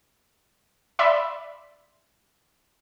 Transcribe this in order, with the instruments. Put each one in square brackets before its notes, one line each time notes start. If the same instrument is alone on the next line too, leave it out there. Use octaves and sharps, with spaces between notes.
[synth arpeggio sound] D5 E5 B5 C6